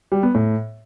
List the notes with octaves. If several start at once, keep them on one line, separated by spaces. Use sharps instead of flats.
G3
B3
A2